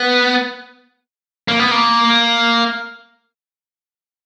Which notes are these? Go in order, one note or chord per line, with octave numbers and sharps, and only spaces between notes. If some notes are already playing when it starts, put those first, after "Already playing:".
Already playing: B3
A#3
B3
A#3